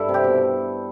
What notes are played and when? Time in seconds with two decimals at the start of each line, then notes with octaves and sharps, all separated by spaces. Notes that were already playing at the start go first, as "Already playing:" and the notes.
Already playing: G2 D4 E4 A4
0.09 C3
0.14 G4
0.24 B2